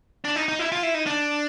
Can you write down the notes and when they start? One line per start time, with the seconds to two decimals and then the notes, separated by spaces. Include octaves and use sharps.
0.25 D4
0.36 D#4
0.48 D#4
0.59 E4
0.72 F4
0.83 E4
0.95 D#4
1.06 D4